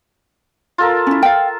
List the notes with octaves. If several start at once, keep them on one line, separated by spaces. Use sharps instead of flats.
F4 A4 A#4
C#4 E4
F5 G5